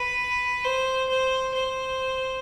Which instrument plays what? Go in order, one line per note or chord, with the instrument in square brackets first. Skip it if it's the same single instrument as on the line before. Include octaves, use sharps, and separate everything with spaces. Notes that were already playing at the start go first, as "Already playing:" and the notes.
Already playing: [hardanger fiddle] B4
C5
C5
C5